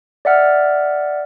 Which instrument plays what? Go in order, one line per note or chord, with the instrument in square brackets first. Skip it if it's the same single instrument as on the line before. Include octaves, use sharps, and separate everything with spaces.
[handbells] D5 E5 F#5 F6